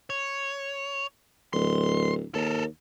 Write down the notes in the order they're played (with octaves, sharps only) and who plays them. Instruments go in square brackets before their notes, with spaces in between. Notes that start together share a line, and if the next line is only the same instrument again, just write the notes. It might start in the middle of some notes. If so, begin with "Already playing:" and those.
[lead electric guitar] C#5
[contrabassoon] D1 [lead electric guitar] C6
[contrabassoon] D#2 [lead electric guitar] A4 A#4